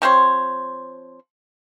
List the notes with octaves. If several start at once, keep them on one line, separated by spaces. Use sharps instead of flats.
F3 C4 C5 C#5